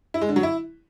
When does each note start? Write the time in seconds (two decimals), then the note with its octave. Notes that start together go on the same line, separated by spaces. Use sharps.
0.14 E4
0.21 G#3
0.29 D3
0.36 F#3
0.43 E4